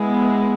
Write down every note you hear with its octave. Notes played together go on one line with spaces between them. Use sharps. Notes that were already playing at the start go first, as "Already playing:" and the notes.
Already playing: G#3 B3 E4